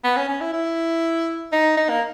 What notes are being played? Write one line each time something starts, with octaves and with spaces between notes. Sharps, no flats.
B3
C#4
C#4
E4
E4
D#4
D#4
A#3